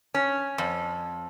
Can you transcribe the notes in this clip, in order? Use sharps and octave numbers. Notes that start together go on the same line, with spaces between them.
C#4
F2